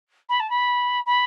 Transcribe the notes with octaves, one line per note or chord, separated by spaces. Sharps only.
B5
A5
B5
B5